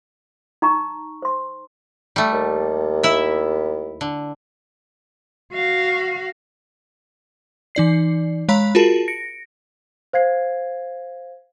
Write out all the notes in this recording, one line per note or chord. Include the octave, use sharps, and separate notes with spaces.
D#4 A#5 C#6
C5 C6
G3 A3
D#2
E4 E5
D3
F#4 F5
E3 D#4 D5 C7
G#3 C#5 F5 A#5 B5 B6
F4 F#4 G#4 A#4 A5
A#6 C#7 D7
C5 F5 G#6 C7